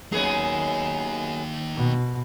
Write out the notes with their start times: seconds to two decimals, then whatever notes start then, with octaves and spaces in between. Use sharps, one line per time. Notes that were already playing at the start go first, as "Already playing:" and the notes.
0.12 F#2 A#3 B3 D#4 G#4
1.75 B2